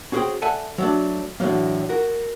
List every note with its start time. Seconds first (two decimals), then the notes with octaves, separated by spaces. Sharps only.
0.12 C#4 F#4 G#4 B4 C5 G5
0.42 A4 D5 E5 F#5 G#5 A5
0.78 F#3 A3 D4
1.40 A2 D3 E3 F#3 A#3
1.89 F#4 A#4